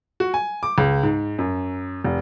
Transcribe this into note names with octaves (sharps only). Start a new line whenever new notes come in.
F#4
G#5
D6
C#2
G#2
F#2
F1